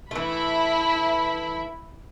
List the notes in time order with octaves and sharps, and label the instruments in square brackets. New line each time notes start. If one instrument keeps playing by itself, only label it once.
[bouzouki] E3 A3 [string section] E4 B5